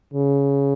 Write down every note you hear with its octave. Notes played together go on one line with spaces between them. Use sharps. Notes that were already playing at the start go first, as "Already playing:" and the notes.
C#3